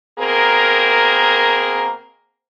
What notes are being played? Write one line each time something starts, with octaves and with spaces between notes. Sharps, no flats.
B2 A#3 C4 G#4 A#4